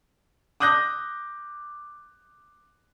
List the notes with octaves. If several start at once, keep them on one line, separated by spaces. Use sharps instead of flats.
D6 D#6 F#6 G6 A#6